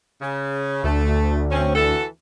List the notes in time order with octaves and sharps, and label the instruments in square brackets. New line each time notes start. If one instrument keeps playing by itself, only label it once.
[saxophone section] C#3
[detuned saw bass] D2 [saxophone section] A3
[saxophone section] C4 C#4
E3 F#4 A4